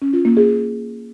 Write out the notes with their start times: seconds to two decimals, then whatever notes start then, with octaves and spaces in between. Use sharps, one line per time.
0.02 C#4
0.13 F4
0.25 A#3
0.37 G#4